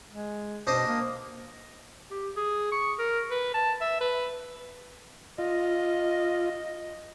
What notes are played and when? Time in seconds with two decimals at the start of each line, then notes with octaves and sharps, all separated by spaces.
0.10 G#3
0.67 B2 D4 C5 D#5
0.86 A#3
2.11 G4
2.36 G#4
2.72 C#6
2.99 A#4
3.30 B4
3.54 A5
3.81 E5
4.01 B4
5.38 F4 D#5